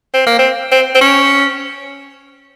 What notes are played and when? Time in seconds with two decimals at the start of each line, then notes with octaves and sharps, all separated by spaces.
0.14 C4
0.27 A#3
0.39 C4
0.72 C4
0.95 C4
1.01 C#4